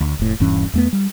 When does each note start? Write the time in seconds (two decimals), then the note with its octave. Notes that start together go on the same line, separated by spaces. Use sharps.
0.01 D2
0.19 F1 A2
0.40 D#1 G2 E3 C#4
0.73 E2 A3 B3
0.93 G3